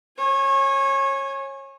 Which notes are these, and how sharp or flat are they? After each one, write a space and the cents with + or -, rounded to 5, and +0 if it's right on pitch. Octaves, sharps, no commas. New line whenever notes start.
C#5 -25 G#5 +0